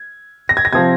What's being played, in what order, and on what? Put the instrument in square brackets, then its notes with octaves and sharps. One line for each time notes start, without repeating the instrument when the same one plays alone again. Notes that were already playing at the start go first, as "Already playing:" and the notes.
Already playing: [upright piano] G#6
A#6
G#6
A#6
C3 F3 C4 G#6